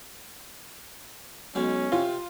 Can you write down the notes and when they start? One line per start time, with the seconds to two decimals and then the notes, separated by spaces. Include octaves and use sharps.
1.55 B1 B2 G#3 C#4
1.92 C3 F4